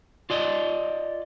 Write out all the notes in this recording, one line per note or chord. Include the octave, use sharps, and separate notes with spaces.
F4 D5 D#5